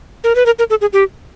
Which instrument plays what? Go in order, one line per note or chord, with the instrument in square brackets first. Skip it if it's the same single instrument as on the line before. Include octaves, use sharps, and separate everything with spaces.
[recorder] A#4
B4
A#4
A#4
A4
G#4
G4